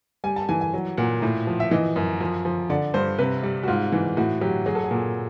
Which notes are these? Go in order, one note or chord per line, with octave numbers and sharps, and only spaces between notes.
G3 G#5
A5
E3 G#5
G#5
F#3
A#2 F#5
A2
F3
E5
E3 D#5
F#2
F3
F3
D3 D5
G2 C5
C3 B4
G3
F#4
G#2 F4
E3
A2 F#4
F#3 G4
F#3 G#4
A4
G#4
A#2